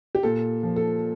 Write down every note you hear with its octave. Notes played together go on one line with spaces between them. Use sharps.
G4
A#2 A4
F3
A4